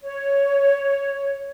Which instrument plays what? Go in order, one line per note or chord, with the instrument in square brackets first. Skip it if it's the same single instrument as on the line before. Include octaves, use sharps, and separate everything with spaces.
[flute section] C#5